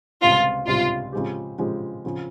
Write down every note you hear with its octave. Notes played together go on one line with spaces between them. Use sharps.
C#2 C3 G3 C4 F4
C#2 C3 G3 C4 F4
C#3 F3 G#3 C4 G4
C#3 F3 G#3 C4 G4
C#3 F3 C4